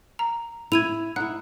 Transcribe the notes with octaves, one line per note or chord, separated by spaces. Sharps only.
A#5
E4 G#6 D#7 F7
D#4 E4 F#5 F#6